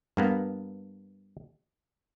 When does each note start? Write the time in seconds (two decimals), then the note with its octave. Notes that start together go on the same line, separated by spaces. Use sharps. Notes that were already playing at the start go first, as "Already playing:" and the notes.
0.17 G2 A#3 B3